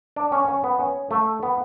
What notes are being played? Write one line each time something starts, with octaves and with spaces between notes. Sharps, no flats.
D4
C#4
C#4
B3
C#4
A3
B3